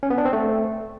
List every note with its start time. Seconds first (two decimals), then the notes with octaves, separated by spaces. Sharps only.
0.03 C#4
0.10 B3
0.18 D4
0.25 C4
0.33 A3